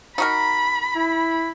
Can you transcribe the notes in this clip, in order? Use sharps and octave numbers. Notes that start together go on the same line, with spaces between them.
D#4 F#4 A#4 B5
E4